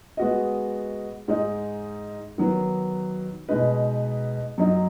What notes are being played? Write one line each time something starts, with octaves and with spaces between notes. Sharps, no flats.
G#3 B3 F#4 D#5
G#2 G#3 D#4
D#3 F#3 B3
B2 G#3 D#4 B4
F#2 F#3 D#4